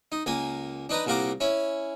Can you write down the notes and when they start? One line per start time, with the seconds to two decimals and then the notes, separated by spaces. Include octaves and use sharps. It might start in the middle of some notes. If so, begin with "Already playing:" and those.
0.12 D#4
0.26 C#2 A#3 G#5
0.89 D4 D#4 B4 A#5
1.06 C2 A#2 F#4 F5 A#5 D6
1.40 C#4 E4